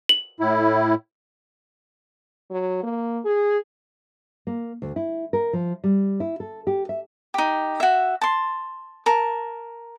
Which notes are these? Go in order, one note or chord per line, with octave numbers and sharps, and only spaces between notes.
F#7
A2 E4
F#3
A#3
G#4
A#3
D2
E4
A#4
F3
G3
E4
A4
G4
E5
D#4 G4
F#4 E5
A5 C6
A#4 A5